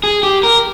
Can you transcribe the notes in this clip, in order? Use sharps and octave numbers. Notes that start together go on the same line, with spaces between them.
G#4
G4
A#4